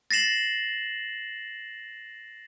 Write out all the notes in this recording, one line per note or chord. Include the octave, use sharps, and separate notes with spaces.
A6 A#6 C7 E7 F#7